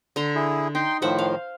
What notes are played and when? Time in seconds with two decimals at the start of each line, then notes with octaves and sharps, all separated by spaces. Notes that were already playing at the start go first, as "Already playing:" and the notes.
0.16 D3 A#5 C6
0.35 E4 G#4
0.75 D#4 G5 C6
1.02 A2 D#3 F3 C5 E5 F#5
1.19 F5